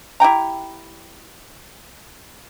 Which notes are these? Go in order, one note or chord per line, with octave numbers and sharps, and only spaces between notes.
E4 G4 G5 A#5